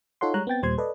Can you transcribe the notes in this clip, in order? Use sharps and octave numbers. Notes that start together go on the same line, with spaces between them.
D#4 F4 A4 C#5 F#5 C6
G3 G#3 C#5 A#5 F#6
B3 C4 G5 A6
D#2 A#2 G3 C5 C6 G#6
A4 B4 D5 D#5